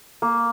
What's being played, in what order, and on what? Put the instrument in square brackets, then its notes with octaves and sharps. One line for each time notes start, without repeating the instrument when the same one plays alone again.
[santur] A#3